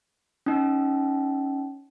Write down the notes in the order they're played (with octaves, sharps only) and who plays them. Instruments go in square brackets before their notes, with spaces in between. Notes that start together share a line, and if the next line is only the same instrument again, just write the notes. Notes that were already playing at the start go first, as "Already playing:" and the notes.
[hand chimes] C#4 D#4